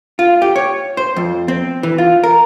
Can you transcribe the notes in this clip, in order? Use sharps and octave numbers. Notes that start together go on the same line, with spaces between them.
F4
G4
C#5
C5
F2
C4
E3
F4
A#4